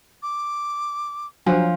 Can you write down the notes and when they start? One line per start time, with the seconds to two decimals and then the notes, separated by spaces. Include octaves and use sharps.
0.23 D6
1.46 F3 F#3 D4 C5